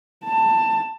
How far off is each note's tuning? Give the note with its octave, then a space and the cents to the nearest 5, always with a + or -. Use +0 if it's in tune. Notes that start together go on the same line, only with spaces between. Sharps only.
A5 +15